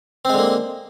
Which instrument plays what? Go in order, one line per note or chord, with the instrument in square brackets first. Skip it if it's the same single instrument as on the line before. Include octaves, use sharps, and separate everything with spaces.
[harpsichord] C4
G#3
D3
A#3